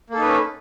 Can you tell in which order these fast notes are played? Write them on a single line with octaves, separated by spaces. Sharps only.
A#3 A4 D#4 B4 C#4